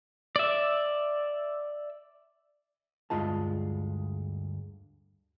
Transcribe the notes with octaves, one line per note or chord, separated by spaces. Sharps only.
D5 E5
D2 G2 G#3 F4 A5